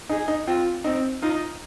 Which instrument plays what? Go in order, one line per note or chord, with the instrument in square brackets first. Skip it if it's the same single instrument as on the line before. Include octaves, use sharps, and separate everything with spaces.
[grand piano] D#4 [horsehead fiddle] G#4
[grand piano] D#4
[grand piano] C4 [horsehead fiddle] F4
[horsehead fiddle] C4 [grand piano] D#4
[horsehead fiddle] D#4 [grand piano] F4